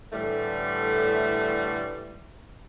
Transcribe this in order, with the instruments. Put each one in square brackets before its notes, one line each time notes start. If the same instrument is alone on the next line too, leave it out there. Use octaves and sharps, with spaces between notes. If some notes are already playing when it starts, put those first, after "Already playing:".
[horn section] A2 D3 E3 G3 A3